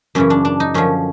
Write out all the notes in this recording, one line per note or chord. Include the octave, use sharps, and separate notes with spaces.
F#2 C#3 E3 C#4
D4
D4
D#4
F#2 D3 F3 C#4